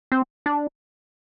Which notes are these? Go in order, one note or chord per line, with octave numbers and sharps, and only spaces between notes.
C4
D4